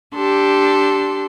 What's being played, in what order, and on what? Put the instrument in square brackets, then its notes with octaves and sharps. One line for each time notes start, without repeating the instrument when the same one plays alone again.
[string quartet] D4 G4 A4 C6